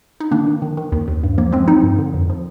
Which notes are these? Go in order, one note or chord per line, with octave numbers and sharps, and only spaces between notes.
D#4
D#3 A#3 D4
D#3
D#3
D#3
D#2
D#2
G2
F3 A#3
F3 G#3 C4
F3 C4 D#4
G2
D3
F2
F3